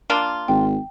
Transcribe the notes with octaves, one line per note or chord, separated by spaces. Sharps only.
A#3 D4 F4
G#1 G5